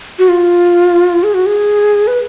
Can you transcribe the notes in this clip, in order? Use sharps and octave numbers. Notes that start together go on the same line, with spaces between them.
F#4
F4
G#4
F#4
G#4
B4